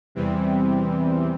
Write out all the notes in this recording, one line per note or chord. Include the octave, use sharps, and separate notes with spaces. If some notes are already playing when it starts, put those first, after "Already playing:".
E2 C3 E3 G3 C4